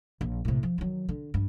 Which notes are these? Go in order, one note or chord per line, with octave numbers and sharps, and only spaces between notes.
A#1
A2 C3
F3
D#3 F#3
D3
G2